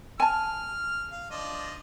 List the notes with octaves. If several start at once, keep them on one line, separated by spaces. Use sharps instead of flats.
G#5 A5 F6
F5
F3 D4 D#5